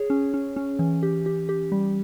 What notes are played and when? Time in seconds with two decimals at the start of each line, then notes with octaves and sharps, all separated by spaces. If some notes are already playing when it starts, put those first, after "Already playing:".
Already playing: G#4 C#5
0.10 C#4
0.34 C#4
0.56 C#4
0.79 E3
1.03 G4
1.26 G4
1.49 G4
1.72 G3